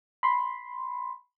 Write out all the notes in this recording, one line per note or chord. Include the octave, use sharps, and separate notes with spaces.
B5 C6